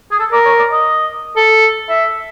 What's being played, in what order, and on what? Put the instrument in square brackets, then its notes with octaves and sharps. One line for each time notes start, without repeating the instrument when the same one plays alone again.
[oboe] G#4
A4
[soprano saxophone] A#4 [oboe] D5
[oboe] C#5
D5
D#5
[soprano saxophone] A4
[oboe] E5